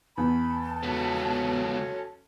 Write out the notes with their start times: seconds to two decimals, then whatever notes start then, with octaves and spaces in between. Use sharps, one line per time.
0.18 E2 A5 B5
0.83 C#2 F#3 B3 C#4 A4